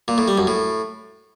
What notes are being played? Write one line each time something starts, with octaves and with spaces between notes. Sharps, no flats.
A#2
A2
G3
F#2
A2